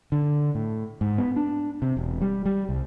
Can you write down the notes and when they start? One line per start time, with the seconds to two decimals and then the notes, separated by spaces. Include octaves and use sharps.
0.12 D3
0.55 A2
1.01 G#2
1.18 B3
1.36 D4
1.82 C3
1.97 E1
2.22 G3
2.46 G3
2.69 C2